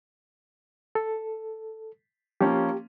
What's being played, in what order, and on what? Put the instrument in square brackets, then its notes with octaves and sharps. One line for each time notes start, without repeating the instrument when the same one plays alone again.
[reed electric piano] A4
[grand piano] F3 A#3 C#4 [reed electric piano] G4